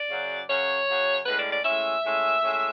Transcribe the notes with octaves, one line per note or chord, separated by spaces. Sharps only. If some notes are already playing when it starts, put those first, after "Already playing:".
Already playing: D5
F#2 C#3 F#3
F#2 C#3 F#3 C#5
F#2 C#3 F#3
A2 G#3 C#4 B4
D5
D5
A2 G#3 C#4 E5
A2 G#3 C#4
A2 G#3 C#4